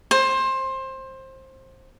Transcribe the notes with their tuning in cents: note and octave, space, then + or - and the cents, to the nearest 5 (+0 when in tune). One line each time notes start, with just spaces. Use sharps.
C5 +20